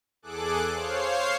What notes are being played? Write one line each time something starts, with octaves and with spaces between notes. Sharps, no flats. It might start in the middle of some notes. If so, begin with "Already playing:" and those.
E2 G#4 A4 D6 F#6
C5 C#5 F5 C7